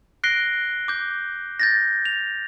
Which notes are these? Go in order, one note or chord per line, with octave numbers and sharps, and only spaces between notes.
F#6 A#6 C7 D7 G7
D6 G6
G6 A6 A#6
F7